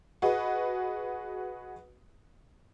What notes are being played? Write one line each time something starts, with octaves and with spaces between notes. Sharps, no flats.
F#4 G#4 B4 D#5